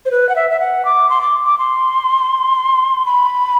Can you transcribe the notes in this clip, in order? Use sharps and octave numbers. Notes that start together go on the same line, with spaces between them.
C5
B4
F#5
E5
E5
F#5
D6
C6
D6
D6
C6
B5